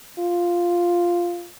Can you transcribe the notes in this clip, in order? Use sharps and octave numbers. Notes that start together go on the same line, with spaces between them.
F4